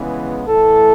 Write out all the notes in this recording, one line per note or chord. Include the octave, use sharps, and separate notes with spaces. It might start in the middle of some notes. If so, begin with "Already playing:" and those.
Already playing: C#3 E3 G#3 B3
A2 E3 A3 A4